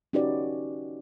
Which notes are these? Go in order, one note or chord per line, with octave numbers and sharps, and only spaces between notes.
C#4 D#4 F#4 G4 B4 D5